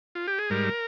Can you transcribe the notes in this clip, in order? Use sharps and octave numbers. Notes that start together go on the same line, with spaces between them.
F4
G4
G#4
G#2 G3 A#4